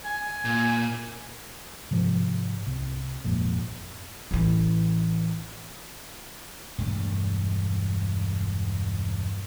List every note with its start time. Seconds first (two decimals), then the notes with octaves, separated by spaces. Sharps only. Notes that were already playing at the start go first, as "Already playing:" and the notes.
0.05 G#5
0.45 A#2
1.91 G#2 C3 F3
2.67 C2
3.24 G#1 F2 A#2
4.31 A1 E3
6.78 E1 G2 A3